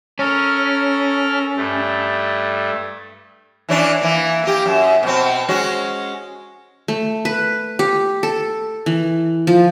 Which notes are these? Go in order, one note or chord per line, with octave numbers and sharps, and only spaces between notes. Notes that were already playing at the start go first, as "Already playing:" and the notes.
C#4 A4 A#4 F6
G2 A3
E3 C#4 D4
E3 A#3
A#3 G4
F#2
B2 C4
G#3 C#4 F#4
A3
B4
G4
A4
E3
F3